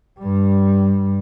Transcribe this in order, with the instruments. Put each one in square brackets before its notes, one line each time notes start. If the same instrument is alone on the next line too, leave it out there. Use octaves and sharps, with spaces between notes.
[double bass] G2 G3